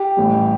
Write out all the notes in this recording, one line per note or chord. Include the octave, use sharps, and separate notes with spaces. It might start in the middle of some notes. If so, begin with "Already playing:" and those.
Already playing: G4
A1 A2 G3